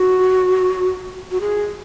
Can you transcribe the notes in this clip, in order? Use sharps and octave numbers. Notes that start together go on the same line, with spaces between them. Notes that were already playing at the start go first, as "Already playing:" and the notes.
Already playing: F#4
F#4
G#4